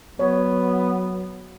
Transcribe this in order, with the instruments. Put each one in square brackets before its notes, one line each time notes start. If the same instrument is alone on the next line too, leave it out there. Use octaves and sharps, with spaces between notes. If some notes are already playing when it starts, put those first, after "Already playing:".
[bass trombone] F#3 [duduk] B3 [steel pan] C#5